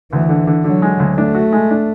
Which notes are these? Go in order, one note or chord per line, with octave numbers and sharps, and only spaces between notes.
D2 E3
D3
D3
D3 F#3
G#3
D2
A3 D4
F#4
G#3
D4